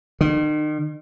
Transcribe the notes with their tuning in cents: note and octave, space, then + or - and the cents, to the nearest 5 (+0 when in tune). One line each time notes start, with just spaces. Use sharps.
D#3 -40